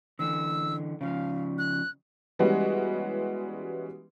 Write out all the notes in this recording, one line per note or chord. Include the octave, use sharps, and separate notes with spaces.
D3 E3 E6
C#3 F3 F5
F#6
E3 G3 G#3 B3 C#4 F#4